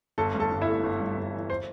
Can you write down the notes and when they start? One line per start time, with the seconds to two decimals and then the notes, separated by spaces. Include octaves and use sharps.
0.18 G1 A4 A5
0.35 G2
0.40 A4 A5
0.51 G1
0.61 E4 E5
0.68 A3
0.84 G1
1.00 G2
1.17 G1
1.34 E3
1.50 C5